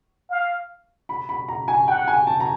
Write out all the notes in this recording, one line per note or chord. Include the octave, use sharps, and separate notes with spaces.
F5
B5
B5
A#5
G#5
F#5 G5
G#5
A5
A#5